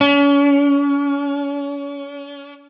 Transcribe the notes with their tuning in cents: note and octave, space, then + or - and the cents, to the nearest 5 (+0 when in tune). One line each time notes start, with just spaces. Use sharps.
C#4 +35